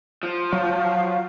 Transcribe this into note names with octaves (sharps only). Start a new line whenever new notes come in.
F3
F#3 F5